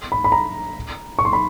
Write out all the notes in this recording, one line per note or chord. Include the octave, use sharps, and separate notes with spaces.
B5
B5
A#5
C#6
C6
B5